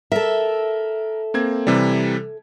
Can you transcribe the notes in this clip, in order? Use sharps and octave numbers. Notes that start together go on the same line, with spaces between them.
A4 A#4 E5
A#3 C4 G#6
C3 E3 G3